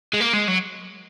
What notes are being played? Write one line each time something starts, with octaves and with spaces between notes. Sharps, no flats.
G#3
A#3
G#3
F#3